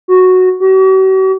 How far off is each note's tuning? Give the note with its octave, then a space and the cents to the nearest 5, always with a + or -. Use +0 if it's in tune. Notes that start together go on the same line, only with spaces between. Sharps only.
F#4 -5
F#4 +45